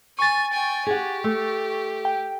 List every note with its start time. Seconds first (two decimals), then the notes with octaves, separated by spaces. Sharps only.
0.19 G#5 C#6 A6
0.53 G5 G#5
0.86 G4 G#4 F#5
1.24 A3
2.05 G5